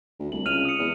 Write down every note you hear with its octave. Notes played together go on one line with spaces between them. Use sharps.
D2
C2 F#7
C#2 F6 D#7 F7
D#6 C#7
E2